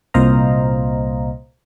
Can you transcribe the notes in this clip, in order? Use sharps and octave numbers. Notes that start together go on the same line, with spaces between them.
C2 A#2 C5 D#5 F5 A#5